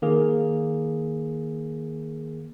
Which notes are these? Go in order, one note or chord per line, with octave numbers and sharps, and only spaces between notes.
D#3 A#3 G#4